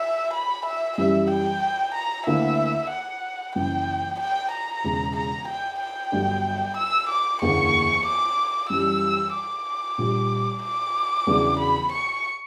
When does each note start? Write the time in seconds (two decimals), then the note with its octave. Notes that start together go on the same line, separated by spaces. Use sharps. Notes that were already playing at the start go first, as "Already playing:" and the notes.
Already playing: E5
0.33 B5
0.66 E5
0.98 F#2 E3 G3 E5
1.30 G5
1.94 A#5
2.26 D2 D3 A#3 E4 E5
2.91 F#5
3.55 F#1 F#2 E3 G5
4.20 G5
4.52 A#5
4.84 E1 E2 C#3 E3
5.16 A#5
5.48 G5
5.80 G5
6.12 G1 G2 F#3
6.77 E6
7.09 D6
7.42 F#1 E2 D3 A#3 C#6
8.06 D6
8.70 F#2 E3 G3 E6
9.34 D6
9.98 A#1 A#2 G3
10.63 D6
11.27 E2 C#3 F#3 B3 D4
11.60 B5
11.92 C#6